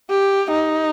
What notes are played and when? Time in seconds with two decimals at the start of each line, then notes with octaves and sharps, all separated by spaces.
0.10 G4
0.51 D#4